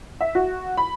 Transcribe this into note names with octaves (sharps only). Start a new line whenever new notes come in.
E5
F#4
B5